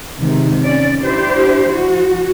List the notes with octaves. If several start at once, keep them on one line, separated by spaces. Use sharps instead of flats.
C3 D#3 G#3
C#4 D5
D4 E4 G4 C5
F3 F#4